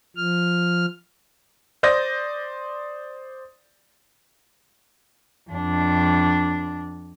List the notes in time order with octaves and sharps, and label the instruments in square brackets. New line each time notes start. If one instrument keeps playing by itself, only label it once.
[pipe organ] F3 F6
[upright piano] C5 D5 D#6 G6 A#6
[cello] F2 D4